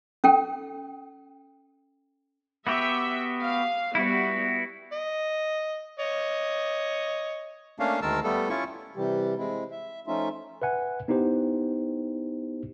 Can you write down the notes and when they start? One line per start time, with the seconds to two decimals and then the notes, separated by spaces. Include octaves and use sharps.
0.24 C#4 A4 G5
2.67 B3 F#4 G4 E5
3.42 F5
3.95 G3 B3 E4 F#4
4.92 D#5
5.99 C#5 D#5
7.79 A3 A#3 C#4 D4 F5
8.02 D2 D#3 G#3 A#4 A5 E6
8.24 G3 A3 B3 A4
8.49 C#4 E4 F4 C#6
8.96 C3 E3 G3 G4
9.38 G#3 C4 E4
9.71 E5
10.07 F3 A3 C#4 D#4 F4 E5
10.62 B4 E5 F#5 G#5
11.08 B3 D#4 E4 G4 C5